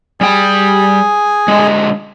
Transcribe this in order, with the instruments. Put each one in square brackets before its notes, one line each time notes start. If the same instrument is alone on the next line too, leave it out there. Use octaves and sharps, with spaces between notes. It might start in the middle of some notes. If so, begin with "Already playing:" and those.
[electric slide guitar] G3 G5 [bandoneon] G#4 G#5
[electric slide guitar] D3 G#3